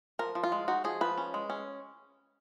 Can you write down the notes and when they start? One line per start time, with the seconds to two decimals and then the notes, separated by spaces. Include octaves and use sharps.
0.19 F3 A#4
0.35 F3
0.43 F4
0.52 G#3
0.68 D#4 F#4
0.84 F3 G#4
1.01 F3 B4
1.18 C#4
1.34 G#3
1.50 C#4